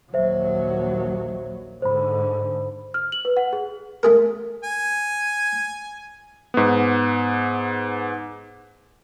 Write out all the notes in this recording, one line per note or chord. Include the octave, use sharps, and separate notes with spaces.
A#1 D#2 F#3 C5 E5
G#2 D3 C5 B5
F6
F#7
B4
F#5
G#4
A3 G#4 A#4
G#5
G#2 B3